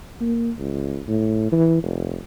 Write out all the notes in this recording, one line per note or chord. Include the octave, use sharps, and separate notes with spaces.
A#3
C#2
A2
E3
F1